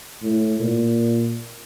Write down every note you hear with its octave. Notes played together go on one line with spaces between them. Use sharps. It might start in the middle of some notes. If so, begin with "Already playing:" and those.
A2
A#2